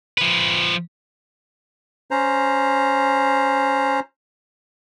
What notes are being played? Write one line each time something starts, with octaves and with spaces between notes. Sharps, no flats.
F3 B4
C#4 C5 A#5